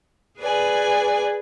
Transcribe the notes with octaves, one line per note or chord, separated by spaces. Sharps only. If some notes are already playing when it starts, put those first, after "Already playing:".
G#4 B4 D5 G#5